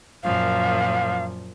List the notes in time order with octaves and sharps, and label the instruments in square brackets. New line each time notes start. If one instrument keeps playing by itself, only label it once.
[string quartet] F#2 A#2 F3 [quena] F5